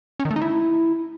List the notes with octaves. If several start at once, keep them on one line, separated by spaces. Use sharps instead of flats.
C#4
D#3
A3
D#4
E4